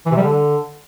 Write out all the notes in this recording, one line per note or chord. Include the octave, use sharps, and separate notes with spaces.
E3
C3
G3
D3